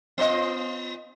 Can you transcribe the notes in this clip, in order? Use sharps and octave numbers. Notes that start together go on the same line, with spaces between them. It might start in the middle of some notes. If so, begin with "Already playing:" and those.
B3 F4 D#5